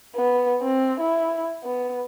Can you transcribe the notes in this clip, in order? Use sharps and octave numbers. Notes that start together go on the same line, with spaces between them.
B3
C4
E4
B3